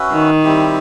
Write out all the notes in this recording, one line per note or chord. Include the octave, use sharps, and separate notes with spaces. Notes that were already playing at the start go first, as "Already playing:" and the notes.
Already playing: C#4 F#4 B4 E5
D#3
G3 C4 E4 G4